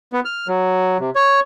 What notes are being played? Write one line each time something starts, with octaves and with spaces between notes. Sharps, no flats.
B3
F6
F#3
C3
C#5